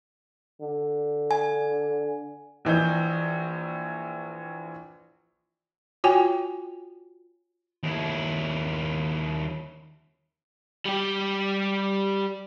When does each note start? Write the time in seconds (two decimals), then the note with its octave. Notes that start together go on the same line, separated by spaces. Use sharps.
0.61 D3
1.31 G#5
2.65 A#1 E3 D#5 G6
6.04 F4 F#4 C#5 G5 G#5
7.83 D#2 E4
10.85 G3 G4